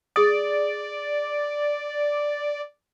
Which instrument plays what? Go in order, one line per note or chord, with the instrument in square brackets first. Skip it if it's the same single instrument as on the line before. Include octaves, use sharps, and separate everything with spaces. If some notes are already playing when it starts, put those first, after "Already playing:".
[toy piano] G#4 D#6 [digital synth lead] D5